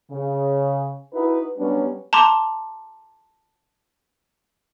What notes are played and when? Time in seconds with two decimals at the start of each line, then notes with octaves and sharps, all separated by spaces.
0.11 C#3
1.14 D#4 E4 F#4 B4
1.58 F#3 G3 B3 C#4 D4 B4
2.13 A5 A#5 C6 D6